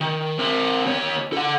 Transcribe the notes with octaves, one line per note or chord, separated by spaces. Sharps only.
D#3
C4 A#4
D#2 C#5
A4 F#5